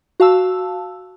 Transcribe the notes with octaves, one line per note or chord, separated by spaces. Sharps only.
F#4 F5 A5 E6